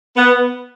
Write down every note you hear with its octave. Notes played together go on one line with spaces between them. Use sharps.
B3